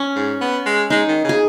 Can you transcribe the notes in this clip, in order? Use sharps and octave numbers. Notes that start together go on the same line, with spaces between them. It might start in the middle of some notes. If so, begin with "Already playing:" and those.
Already playing: C#4
G#2
B3
G#3
G#3 D#4
D#3
C#3
G#4